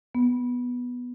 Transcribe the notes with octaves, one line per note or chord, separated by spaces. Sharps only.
B3